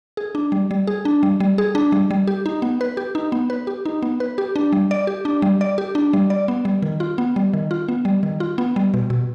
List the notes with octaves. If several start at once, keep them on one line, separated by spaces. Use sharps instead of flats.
G#4
D4
G3
G3
G#4
D4
G3
G3
G#4
D4
G3
G3
G4
D#4
B3
B4
G4
D#4
B3
B4
G4
D#4
B3
B4
G4
D4
G3
D5
G4
D4
G3
D5
G4
D4
G3
D5
B3
G3
D#3
F4
B3
G3
D#3
F4
B3
G3
D#3
F4
B3
G3
B2
B2